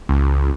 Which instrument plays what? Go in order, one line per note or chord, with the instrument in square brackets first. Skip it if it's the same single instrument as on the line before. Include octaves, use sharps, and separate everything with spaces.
[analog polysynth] C#2